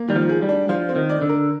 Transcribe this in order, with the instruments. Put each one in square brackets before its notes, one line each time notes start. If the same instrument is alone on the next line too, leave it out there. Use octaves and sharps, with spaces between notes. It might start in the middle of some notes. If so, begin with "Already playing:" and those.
Already playing: [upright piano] A#3
[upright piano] D#3 [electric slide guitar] G3
[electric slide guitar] F3
[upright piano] G#4
[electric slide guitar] G3
[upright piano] D4
[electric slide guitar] F3 [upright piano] F4
[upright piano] C4
[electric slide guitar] D#3
[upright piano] D5
[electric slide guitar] D3
[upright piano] A#4